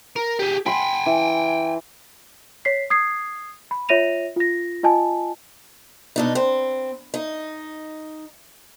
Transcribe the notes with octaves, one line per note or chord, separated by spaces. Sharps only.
A#4
G4 G#4
G5 G#5 B5 C6
E3
C#5 B6 C7
D#6 G#6 C7
B5
F4 C#5 E5 A#6 D#7 F7
F4 A#6
F4 D#5 G#5 A5
B2 D4 D#4
C4
D#4